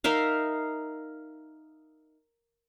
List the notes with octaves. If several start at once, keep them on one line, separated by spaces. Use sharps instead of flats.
D#4 A#4 E5 F5